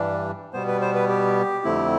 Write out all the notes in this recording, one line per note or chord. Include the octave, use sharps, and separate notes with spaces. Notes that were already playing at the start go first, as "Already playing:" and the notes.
Already playing: G2 E3 G3 D4
B2 G3 B3 C5
B4
C5
B4
G4
F2 D3 A3 C4 E4